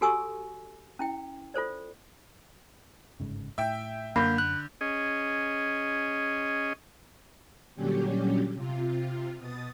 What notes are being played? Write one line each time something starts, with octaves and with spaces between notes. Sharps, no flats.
F#4 G4 A4 G#5 C#6 E6
C#4 E4 G5
F4 A4 C5 D5
G1 G#2 C#3
A2 E5 G5 G6
F#2 D3 A#3 B5 G6
F#6
C#4 G#4 D#5
A#2 D3 F#3 G3 C#4 G4
C3 F4
B2 D#6 A6